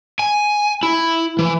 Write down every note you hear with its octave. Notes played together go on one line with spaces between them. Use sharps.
G#5
E4
E3